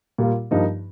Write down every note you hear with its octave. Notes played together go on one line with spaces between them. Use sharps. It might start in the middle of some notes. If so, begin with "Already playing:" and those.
A#2 G3 A#3 F4
G2 F3 A#3 D#4